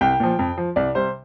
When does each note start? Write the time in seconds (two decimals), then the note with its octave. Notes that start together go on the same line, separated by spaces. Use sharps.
0.01 C2 G5
0.20 A#2 F3
0.39 F2
0.58 F3
0.76 C2 D5
0.95 C3 G3 C5